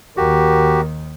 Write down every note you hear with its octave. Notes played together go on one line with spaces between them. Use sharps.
D#2 D#3 F#4 G4 A#4